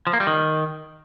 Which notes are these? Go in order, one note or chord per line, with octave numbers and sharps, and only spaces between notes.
F3
A#3
G3
D#3